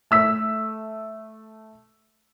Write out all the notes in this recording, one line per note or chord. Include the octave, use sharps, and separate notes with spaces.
A3 E6 B6